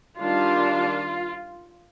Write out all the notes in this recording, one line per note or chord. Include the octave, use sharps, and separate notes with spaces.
D#3 G3 D4 F4